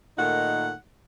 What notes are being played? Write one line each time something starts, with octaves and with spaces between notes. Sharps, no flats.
A#2 D#3 A3 D#4 F#5